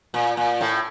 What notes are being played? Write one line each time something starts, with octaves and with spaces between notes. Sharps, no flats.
A#2
A#2
A2